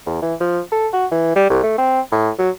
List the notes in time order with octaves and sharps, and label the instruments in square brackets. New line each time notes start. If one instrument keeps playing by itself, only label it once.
[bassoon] E2
E3
F3
A4
F#4
E3
G3
C2
A3
C4
A2
F#3